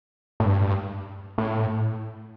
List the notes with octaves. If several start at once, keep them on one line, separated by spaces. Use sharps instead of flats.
A2
G2
A2